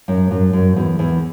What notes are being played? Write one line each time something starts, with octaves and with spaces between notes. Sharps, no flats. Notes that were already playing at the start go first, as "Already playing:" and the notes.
F#2
F#2
F#2
E2
E2